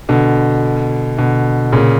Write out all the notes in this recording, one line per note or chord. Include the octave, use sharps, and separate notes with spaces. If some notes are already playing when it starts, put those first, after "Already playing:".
B2 D3
B2 D3
A#2 C#3